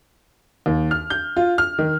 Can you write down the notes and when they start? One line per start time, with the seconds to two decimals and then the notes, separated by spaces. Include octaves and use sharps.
0.66 D#2
0.91 F6
1.10 G6
1.36 F4
1.58 F6
1.79 D#3